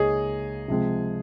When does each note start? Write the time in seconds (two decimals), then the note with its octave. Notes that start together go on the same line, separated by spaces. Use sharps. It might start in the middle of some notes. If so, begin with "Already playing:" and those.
Already playing: C#2 A#3 D#4 G#4 C#5 D#5
0.68 C3 F3 G#3 C4